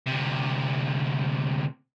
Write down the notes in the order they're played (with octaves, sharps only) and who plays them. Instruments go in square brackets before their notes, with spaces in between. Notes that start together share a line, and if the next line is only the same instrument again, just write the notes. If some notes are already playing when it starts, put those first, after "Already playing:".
[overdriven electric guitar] D2 C3